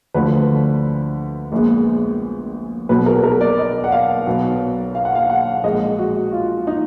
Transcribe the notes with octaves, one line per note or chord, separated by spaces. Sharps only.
D2 D3 F3 B4
A#1 A#2 G#3 B3
B1 B2 F#3 B3 B4
A#4
A#4
D5
D#5
F#5
F5
B1 B2 F#3 B3
F5
F#5
F5
F#5
A#1 A#2 G#3 D#5
F#4
F4
D#4